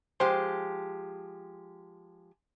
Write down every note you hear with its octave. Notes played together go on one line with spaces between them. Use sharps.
F3 G#3 G4 C5 G#5 C6